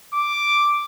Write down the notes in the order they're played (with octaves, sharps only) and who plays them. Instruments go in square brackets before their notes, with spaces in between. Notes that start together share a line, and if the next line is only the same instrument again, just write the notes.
[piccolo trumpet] D6